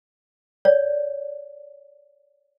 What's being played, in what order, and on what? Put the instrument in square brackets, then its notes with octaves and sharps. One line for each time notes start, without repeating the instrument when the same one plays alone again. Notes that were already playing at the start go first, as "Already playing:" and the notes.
[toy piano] C#5 D5